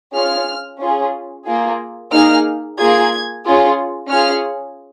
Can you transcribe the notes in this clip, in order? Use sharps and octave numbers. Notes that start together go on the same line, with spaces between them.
C#4 F4 G#4 F6
C#4 F4 G#4
A#3 F4 G#4
A#3 D#4 G#4 F6
A#3 F4 G#4 G#6
C#4 F4 G#4
C#4 F4 G#4 F6